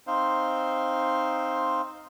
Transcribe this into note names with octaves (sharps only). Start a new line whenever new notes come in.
C4 D#4 C5 F5